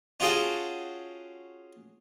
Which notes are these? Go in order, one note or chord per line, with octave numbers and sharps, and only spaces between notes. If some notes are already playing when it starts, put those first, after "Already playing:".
C#4 F4 F#4 G#4 G5 A5